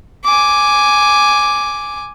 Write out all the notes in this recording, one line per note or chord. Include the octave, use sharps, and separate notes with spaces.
G#5 D6